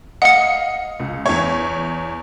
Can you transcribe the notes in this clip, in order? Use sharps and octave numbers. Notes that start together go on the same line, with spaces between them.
D#5 F5 F#5 D#6 C#7
C#2
E2 C#5